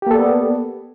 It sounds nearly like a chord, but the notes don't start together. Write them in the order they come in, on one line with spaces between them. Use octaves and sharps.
G4 A#3 A4 D5 B3